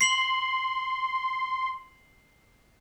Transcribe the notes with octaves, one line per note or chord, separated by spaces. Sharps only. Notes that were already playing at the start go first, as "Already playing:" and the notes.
C6 C7 F#7